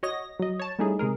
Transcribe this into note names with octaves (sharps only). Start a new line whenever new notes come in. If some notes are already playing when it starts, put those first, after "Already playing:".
F#4 C#5 D#5 A#6
F#3 D#5
C#5 A5
G3 A3 C#4 D#4 E4 G#4
C3 G#3 G#4 A#4